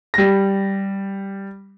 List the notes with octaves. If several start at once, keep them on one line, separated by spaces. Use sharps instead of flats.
G3 A#6